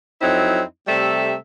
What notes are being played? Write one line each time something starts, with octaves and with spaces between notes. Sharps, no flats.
F2 F#3 C4 D#4 E4
C3 G3 A3 A4 E5